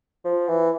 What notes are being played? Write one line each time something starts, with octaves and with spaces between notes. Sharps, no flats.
F3
E3